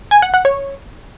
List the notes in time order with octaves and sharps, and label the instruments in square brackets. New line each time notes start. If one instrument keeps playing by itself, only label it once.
[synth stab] G#5
F#5
F#5
C#5